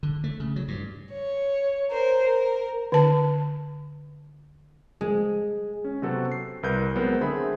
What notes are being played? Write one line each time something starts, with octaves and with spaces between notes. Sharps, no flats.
D3
A3
C#3
F#3
G2
C#5
A#4 C5
A#4
D3 A5
G#3 G#4
C#4
C3 F#3 B3 C4 F#4 A4
C7
C2 A#4 B4 G6
F#3 G#3 B3 C4 A#4 C5
D3 C4 G#4 E5 B5